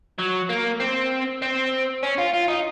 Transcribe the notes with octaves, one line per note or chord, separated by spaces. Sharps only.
F#3
A#3
C4
C4
C#4
F4
F4
D#4